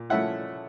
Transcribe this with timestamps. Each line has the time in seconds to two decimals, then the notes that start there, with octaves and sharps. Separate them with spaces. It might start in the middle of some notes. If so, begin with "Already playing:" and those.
Already playing: A#2
0.10 F3 A3 C#4 E4 E5 F#5